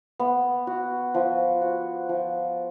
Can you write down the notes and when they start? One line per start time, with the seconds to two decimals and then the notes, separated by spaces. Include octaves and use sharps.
0.19 B3
0.67 F#4
1.14 F3
1.62 F#4
2.09 F3